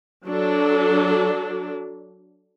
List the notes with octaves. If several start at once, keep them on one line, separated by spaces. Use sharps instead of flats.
F#3 D4 A4